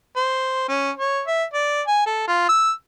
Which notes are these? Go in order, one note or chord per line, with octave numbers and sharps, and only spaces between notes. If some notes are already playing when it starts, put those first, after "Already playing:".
C5
C#4
C#5
E5
D5
G#5
A4
F4
E6